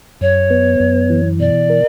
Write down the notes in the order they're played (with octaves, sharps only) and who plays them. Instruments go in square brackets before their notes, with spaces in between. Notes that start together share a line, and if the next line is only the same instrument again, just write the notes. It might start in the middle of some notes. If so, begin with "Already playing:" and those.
[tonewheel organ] F#2 [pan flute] C#5
[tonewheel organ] B3
F#2
E3
[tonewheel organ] B2 [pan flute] D5
[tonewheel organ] A#4